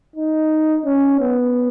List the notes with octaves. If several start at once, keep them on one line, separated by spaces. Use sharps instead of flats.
D#4
C#4
B3